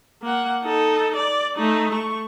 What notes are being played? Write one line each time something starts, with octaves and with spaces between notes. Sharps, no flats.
A#3 F#5
D#4 A4
D5
A3 D#4
A3 C#6